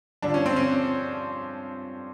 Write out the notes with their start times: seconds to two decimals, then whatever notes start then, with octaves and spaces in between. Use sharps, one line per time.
0.22 G2 D3 F3 D4
0.34 C#4
0.46 C4
0.56 C#4